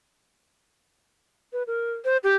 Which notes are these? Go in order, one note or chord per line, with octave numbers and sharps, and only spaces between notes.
B4
A#4
C5
G4